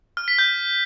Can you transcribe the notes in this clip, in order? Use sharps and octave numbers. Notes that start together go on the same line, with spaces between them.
F6
B6
G6